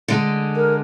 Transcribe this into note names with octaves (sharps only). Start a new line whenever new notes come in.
D3 G#3
A#4